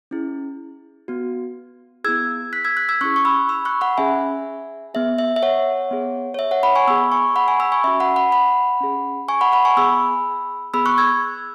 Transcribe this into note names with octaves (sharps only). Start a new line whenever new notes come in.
C#4 E4 G#4
B3 F#4
B3 E4 G#4 E6 G#6
F#6 B6
E6 G#6
F#6 B6
E6 G#6
C#4 E4 G#4 C#6 F#6
C#6
B5 E6
B5 E6
C#6 F#6
F#5 B5
C#4 G#4 E5 G#5
B3 G#4 E5
E5
E5
C#5 F#5
B3 G#4
C#5
E5
C#5 F#5
F#5 B5
G#5 C#6
B3 G#4 B5 E6
G#5 C#6
F#5 B5
G#5 C#6
B5 E6
G#5 C#6
C#4 F#4 E5 G#5
F#5 B5
F#5 B5
F#5 B5
C#4 G#4
G#5 C#6
F#5 B5
F#5 B5
G#5 C#6
B3 G#4 B5 E6
B3 G#4 B5 E6
C#6 F#6
E6 G#6